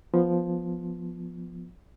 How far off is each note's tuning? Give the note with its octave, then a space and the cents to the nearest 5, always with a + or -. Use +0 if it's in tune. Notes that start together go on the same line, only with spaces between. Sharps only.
F3 +0 B3 +0